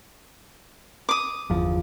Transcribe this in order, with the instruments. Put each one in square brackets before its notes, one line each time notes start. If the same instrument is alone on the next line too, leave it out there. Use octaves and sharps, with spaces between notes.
[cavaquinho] D6 D#6
[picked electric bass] G1 E2 F3